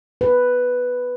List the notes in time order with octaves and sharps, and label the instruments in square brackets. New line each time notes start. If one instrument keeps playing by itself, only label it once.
[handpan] B4